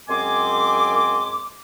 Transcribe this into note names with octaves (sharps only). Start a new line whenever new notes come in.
F#2 G#3 C4 G#5 C6 D6